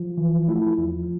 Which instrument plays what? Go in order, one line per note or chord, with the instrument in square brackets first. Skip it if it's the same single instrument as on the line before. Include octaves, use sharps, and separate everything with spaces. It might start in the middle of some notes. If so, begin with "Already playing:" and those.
Already playing: [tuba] F3
[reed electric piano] E3
A3 E4
[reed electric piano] E2 [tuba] F3